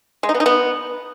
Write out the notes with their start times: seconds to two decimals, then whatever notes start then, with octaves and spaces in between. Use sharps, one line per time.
0.23 G#3
0.29 D#4
0.34 B3
0.40 D#4
0.46 B3